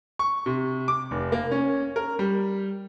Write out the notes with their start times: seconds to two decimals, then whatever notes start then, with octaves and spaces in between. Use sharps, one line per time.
0.19 C#6
0.46 C3
0.88 D6
1.11 F1
1.32 A#3
1.51 C#4
1.96 A#4
2.19 G3